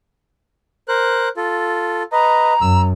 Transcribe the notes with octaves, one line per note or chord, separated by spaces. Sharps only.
A#4 C5 F#6
F4 A4
B4 D#5 A#5
F#2 E6